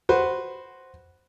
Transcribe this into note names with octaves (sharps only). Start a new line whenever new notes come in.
F#4 B4 C5